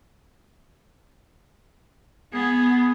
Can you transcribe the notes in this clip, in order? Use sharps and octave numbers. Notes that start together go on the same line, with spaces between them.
B3 G#4